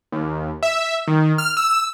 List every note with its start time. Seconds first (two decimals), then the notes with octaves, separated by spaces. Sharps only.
0.12 D#2
0.63 E5
1.08 D#3
1.38 F6
1.57 E6